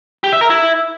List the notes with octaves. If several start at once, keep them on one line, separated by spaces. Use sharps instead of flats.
G4
E5
A#4
E4